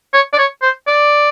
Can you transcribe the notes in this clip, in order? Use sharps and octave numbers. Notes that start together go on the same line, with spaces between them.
C#5
D5
C#5
C5
D5